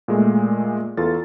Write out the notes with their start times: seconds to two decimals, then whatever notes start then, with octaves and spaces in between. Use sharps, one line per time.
0.08 A#2 G#3 A3
0.97 E2 F4 A4 A6